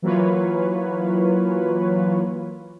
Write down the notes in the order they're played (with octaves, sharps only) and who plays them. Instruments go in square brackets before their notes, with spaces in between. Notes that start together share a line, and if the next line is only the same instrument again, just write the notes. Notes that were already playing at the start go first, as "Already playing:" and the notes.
[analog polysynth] E3 F#3 A#3 F4 B4 C#5